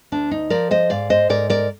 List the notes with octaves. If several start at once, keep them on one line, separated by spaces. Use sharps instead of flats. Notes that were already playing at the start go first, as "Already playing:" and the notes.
D2 D4
D#4
F3 A#4 D5
C5 D#5
G#2 D5 F5
C5 D#5
G#2 A#4 D5
A#4 D5